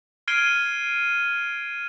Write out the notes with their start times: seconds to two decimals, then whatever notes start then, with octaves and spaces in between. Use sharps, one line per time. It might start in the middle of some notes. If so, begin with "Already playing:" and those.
0.28 F6 G#6 C7 D7 D#7 G7